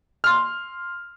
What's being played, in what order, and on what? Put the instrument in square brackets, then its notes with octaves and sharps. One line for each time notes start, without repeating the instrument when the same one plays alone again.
[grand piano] C6 F6